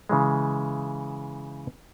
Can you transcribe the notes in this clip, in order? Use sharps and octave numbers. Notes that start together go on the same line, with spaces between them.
C#3 E3 G#3